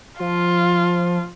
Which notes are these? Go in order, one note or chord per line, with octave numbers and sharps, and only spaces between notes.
F3 F4